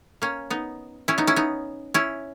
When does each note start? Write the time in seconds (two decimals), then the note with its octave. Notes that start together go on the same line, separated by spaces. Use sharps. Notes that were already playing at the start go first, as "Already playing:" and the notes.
0.22 A#3 C#4
0.50 B3 D#4
1.08 C#4 E4
1.18 B3 D#4
1.27 C#4 E4
1.36 B3 D#4
1.94 C#4 E4